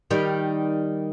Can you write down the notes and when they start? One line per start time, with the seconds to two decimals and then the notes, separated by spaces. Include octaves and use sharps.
0.11 D#3 G3